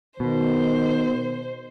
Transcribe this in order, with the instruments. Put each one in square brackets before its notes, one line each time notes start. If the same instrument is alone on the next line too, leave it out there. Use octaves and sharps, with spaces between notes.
[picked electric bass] B2 [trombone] D#3 [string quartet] C5